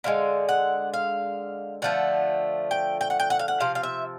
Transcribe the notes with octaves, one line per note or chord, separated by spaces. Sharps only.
D3 F3 G#3 F5
F#5
F5
D3 F3 A3 F#5
G5
G5
F#5
G5
F#5
F5
F#5
C3 F3 F5
F5
E5